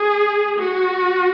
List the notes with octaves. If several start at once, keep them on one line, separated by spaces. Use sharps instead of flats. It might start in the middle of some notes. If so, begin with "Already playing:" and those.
Already playing: G#4
F#4